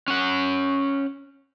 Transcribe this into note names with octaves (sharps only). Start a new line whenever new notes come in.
C#4 F#5